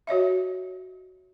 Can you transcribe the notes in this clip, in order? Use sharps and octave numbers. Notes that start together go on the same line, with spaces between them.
F#4 C#5 D#5 E5